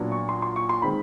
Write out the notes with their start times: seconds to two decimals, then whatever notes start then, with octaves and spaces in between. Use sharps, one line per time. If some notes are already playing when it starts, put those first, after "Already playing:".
Already playing: A#2 F#3 B3 D4
0.12 C#6
0.29 C6
0.42 C6
0.56 C#6
0.69 C6
0.82 D#3 G#3 C4 B5